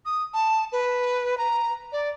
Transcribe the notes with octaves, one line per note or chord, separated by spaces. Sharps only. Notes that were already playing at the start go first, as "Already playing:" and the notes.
D#6
A5
B4
A#5
D5